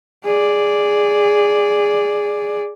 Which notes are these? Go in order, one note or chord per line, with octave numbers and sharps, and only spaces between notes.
G#4 D5